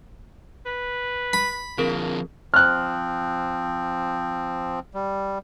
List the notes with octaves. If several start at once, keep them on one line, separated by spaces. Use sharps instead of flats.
B4
B5
D3 F3 A#3 C4 G#4 A#4
F3 C4 F6 F#6
G3